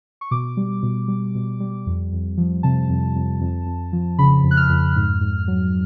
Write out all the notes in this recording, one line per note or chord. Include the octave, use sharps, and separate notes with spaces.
C#6
B2 D6
G3
B2
G3
B2
G3
F2
F2
F3
C3 A5
F2
F2
F2
F2
F3
C#3 B5
F2
F#6
F6
F2
G#2
G#2
F#3